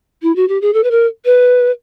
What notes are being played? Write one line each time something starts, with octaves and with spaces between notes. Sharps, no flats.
E4
F#4
G4
G#4
A4
B4
A#4
B4